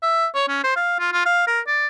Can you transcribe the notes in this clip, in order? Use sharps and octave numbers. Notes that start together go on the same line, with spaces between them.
E5
C#5
C#4
C5
F5
F4
F4
F5
A#4
D5